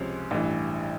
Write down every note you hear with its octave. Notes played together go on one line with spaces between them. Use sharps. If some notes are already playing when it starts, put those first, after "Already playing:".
Already playing: C#2 C3 F3 G#3 C#4
A1 G2 E3